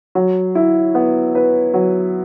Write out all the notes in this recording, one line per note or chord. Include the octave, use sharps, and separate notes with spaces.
F#3
E4
B3
B4
F#3